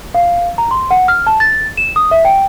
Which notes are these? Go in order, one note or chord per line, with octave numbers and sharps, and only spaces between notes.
F5
A#5
C6
F#5
F6
A5
A6
E7
D#6
E5
G5